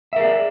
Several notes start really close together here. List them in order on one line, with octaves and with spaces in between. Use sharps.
E5 A#4 G#4 D5